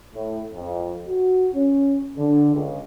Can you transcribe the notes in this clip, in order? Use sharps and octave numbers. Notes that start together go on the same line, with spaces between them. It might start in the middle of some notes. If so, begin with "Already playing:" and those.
A2
F2
F#4
C#4
D3
C#2